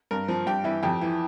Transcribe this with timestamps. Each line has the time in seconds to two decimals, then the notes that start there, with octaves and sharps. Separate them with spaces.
0.11 G2 A#4
0.28 F3
0.46 G2 G4
0.64 E3 E4
0.83 F2 G4
1.02 E3